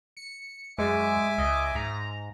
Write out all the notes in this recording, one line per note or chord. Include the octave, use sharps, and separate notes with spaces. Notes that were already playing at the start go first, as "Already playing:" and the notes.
C#7
F#2 G#3 E5 G#5 D6
C#2 D#5
G#2 A#5